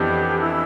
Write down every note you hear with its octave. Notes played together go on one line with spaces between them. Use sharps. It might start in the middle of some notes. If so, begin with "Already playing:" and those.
Already playing: F2 E3 B3 D4 G4
E4